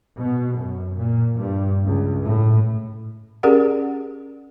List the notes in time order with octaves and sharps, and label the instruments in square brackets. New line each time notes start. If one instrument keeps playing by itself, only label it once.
[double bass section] B2
F#2
A#2
G2
C#2
A2
[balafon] C#4 G4 G#4 A#4 D5 F#5